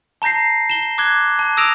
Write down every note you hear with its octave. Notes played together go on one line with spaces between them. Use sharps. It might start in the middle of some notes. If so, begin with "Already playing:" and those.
A5 A#5 G6 A#6 C7
E7 G7
D6 F#6 G#6 G7
A5
D#6 E6 A#6 D7 E7 F7